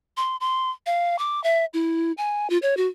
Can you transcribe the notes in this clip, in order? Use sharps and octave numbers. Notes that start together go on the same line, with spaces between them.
C6
C6
F5
D6
E5
E4
G#5
F4
C#5
F#4